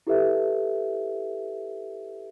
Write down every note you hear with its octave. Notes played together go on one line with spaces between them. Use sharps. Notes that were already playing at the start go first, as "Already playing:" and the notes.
E4 G4 A4 B4 E5